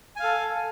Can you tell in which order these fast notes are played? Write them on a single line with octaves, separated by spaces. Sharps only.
G#5 F5 A4